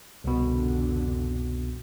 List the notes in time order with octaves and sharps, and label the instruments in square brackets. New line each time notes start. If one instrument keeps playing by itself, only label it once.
[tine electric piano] C2 B2 [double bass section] F2 D3